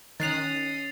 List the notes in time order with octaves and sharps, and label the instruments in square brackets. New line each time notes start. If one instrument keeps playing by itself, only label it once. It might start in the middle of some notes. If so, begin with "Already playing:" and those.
[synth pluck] D#3 F#6 [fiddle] C#4 D#6 [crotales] A6 C7 F7